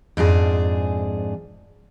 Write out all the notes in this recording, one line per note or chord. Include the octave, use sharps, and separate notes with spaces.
F2 G#2 D4 G#4